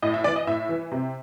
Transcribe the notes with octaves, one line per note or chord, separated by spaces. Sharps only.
A2 D#5
E5
E3 D5
D#5
A2 E5
E3
C3